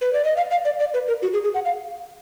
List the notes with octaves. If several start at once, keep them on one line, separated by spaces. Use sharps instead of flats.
B4
D5
D#5
F5
F5
D5
D5
B4
A#4
F#4
G#4
G#4
F#5
F5